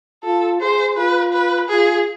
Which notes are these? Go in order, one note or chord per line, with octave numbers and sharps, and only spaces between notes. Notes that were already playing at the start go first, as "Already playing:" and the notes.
F4 A4
G#4 C5
F4 B4
B4
F4 G#4